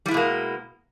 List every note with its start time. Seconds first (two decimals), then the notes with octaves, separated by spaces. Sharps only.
0.06 G3
0.08 E4
0.11 G#3
0.14 B2
0.17 A#3